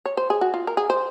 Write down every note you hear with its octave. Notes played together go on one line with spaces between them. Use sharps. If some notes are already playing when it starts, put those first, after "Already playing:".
C#5
C5
G#4
F#4
F4
A#4
G#4
C5